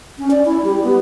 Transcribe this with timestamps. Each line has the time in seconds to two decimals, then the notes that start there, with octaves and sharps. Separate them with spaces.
0.18 C#4
0.31 D5
0.45 E4
0.64 G3
0.84 B3